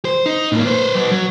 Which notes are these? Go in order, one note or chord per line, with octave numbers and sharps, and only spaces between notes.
C5
D#4
A2 A#3
B4 C5
F#3 B4
F#3